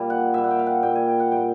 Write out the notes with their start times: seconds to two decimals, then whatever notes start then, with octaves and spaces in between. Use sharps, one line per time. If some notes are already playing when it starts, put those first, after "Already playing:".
Already playing: A#2 G3
0.10 F#5
0.34 A#2 G3 E5
0.44 F#5
0.51 G5
0.59 F5
0.66 F#5
0.83 A#2 G3 G5
0.95 G#5
1.08 G5
1.20 F#5
1.32 G3 G5
1.37 A#2